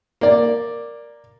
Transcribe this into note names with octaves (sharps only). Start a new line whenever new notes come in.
A#3 D5